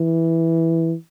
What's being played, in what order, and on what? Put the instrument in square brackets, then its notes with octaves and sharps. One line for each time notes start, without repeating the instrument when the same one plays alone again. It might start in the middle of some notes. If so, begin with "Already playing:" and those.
Already playing: [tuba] E3